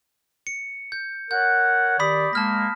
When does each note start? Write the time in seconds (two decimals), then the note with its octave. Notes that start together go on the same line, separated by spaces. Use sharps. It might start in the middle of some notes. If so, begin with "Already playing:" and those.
0.47 C#7
0.92 G6
1.31 A#4 C#5 F#5 G6
2.00 D#3 G4 D5 B5 D#6 B6
2.33 G#3 A#3 A5 F6 A#6